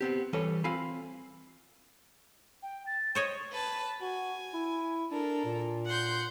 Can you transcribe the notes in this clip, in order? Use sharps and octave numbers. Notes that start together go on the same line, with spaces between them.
B3 C4 G4
E3 G3 A4 B4 C#5
C4 F4 F5 G#5 B5
G5
A6
C5 C#5 D#5 C#6
B4 A5
F#4 G#5
E4
D4 A4 A#4
A#2
F#5 C6 G6